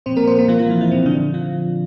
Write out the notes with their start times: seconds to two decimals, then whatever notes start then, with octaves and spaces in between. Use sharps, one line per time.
0.06 A#2 F3 C4 C5
0.17 A#3 A#4
0.27 C4 C5
0.38 A#3 A#4
0.48 F3 F4
0.59 F3 F4
0.70 E3 E4
0.81 E3 E4
0.91 A#2 F3 C4
1.06 D3 D4
1.34 F3 F4